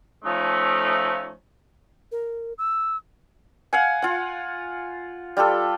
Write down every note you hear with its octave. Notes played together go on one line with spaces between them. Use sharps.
F3 A3 C#4 D#4
A#4
E6
F5 F#5 G#5
F4 F#5
G3 F4 G4 A4